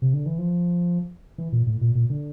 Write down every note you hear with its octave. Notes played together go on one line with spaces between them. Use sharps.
C3
D3
E3
F3
E3
A#2
A2
A#2
A#2
D3